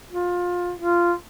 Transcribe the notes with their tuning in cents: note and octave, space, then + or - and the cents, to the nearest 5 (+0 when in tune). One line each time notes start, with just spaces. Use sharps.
F4 +20
F4 -10